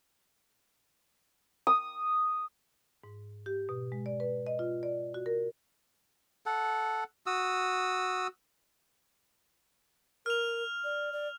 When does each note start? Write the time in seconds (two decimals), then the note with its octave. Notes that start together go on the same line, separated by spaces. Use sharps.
1.67 D#6
3.04 G#2
3.46 G4
3.69 B2
3.92 G#3
4.06 D5
4.20 B4
4.47 D#5
4.59 F4
4.83 D5
5.14 F#4
5.26 A#4
6.46 A4 F#5
7.26 F#4 D#6 E6
10.26 A#4 F6 F7
10.84 D5
11.13 D5